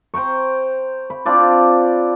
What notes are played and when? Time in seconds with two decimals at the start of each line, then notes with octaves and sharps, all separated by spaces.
0.14 C5 G5 A#5 C#6
1.10 B5
1.26 C4 D4 F4 D5